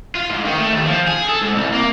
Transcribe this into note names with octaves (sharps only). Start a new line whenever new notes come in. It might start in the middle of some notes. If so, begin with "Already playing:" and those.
F4
G#2
D#3
A3
D#2
F3
G#4
A4
G#2
C2
A#3